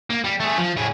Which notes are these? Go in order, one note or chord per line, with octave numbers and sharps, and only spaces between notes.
A#3
G3
A3 G#4
F3
A2 G#4